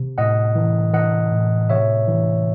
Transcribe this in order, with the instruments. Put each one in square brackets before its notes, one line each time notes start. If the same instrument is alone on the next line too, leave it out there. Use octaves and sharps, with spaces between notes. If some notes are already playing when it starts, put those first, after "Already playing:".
Already playing: [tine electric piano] C3
A2 D#5 F#5
E3
E3 D#5 F#5
A2
C3 C#5 E5
E3